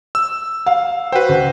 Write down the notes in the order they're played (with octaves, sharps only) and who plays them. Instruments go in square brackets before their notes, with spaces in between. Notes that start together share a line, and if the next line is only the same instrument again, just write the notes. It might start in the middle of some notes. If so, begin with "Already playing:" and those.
[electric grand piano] E6
[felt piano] F5
[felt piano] F#4 F#5 G5 [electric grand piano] B4 C5
[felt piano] C#2